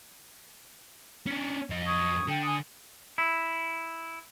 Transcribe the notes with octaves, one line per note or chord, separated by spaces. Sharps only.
C#4 D4
F2 D#5
C#6 D#6 G#6
D3 G5
G#5 D#6
E4